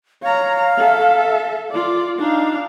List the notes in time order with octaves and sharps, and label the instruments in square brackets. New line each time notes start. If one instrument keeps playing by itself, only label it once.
[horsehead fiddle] C#5 A#5 [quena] F5
[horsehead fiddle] A4 E5
F4 D5
[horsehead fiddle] D4 F5 [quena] D#4